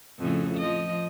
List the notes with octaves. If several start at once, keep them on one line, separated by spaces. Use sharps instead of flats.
F2 A2 C#3
F3 D#5